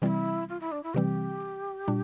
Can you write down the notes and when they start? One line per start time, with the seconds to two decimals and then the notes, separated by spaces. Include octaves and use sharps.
0.02 C3 E3 G3 C4 E4 F4
0.49 F4
0.60 E4
0.72 D4
0.83 E4
0.94 C3 E3 G3 C4 G4
1.88 A#2 G3 D4